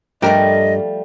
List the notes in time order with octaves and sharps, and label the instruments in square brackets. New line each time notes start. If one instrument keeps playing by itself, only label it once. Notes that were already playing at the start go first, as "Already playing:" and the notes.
[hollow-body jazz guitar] G2 G4 A#4 [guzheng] F3 G3 A3 [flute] D#5